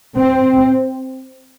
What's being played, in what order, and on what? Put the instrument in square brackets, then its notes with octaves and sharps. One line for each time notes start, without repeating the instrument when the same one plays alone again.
[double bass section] C4